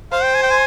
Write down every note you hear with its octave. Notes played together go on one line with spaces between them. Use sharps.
C5 F5
G5
G#5
G5
G#5